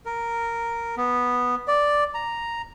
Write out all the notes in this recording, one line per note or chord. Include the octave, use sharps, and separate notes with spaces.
A#4
B3
D5
A#5